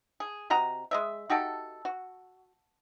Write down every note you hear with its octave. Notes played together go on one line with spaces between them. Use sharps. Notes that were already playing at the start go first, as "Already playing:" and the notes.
G#4
C3 F#4 D#5 A#5
G#3 D#5 E5
D#4 F#4 G4 A4
F#4